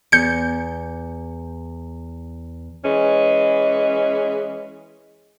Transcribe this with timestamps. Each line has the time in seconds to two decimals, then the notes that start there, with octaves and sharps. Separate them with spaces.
0.12 E2 G6 C#7
2.85 E3 G#3 C#4